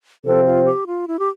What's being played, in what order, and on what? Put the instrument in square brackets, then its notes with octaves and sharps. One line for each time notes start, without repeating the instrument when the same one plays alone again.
[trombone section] C3 F3 C4 [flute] A4
[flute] F4
G4
F4
E4
G4